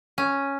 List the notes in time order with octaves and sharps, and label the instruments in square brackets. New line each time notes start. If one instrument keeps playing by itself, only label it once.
[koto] C#4